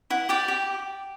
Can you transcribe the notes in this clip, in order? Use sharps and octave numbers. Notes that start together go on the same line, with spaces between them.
E4 F#5
G4 D5 G5
G4